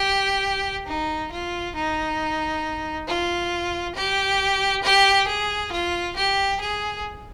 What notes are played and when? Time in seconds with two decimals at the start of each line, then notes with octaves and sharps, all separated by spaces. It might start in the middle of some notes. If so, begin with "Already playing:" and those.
Already playing: G4
0.87 D#4
1.32 F4
1.76 D#4
3.08 F4
3.96 G4
4.84 G4
5.28 G#4
5.72 F4
6.16 G4
6.60 G#4